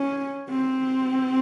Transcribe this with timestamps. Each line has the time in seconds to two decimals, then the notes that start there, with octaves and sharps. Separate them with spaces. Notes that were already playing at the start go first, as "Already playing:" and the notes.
Already playing: C#4
0.50 C4